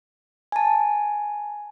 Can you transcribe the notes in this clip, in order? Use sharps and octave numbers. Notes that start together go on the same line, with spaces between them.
G#5 A5